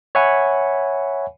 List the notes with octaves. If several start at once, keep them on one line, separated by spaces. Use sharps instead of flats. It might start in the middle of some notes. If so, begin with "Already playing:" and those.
C#5 E5 F#5 G#5 B5